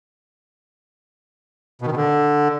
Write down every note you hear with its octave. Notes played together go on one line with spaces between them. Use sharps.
B2
D#3
B2
D3